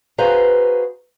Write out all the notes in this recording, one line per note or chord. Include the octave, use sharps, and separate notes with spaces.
F#4 G#4 B4 C5 F5 A#5